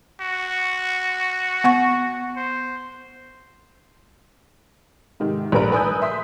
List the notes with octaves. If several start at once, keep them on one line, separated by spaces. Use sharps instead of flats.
F#4
B3 F#5 C#6
C5
G#2 C3 D#3
A#1 G2 A#4 B4 A#5 D7
B4 G#5 D#6 E6 G6
E5 C6 D#6 B6